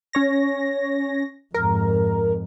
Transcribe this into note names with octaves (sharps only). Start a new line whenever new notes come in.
C#4 C#5 A#6
F2 G#2 A#4